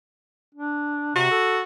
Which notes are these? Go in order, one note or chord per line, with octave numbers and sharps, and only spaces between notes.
D4
C3 F#4
A4